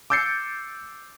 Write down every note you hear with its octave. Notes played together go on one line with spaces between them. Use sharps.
D6 E6 G6 A6 C7 C#7